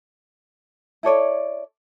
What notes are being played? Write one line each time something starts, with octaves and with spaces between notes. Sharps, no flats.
E4 A4 C#5 D5